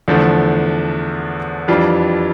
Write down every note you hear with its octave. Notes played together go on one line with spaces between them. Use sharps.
E2 D3 F3 A3
F2 E3 G3 D4 F4